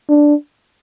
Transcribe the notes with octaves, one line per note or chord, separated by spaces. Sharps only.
D4